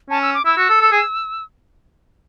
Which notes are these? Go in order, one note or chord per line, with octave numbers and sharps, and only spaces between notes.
C#4 A5
E6
D6
E4 E6
F#4
A4
A4
G#4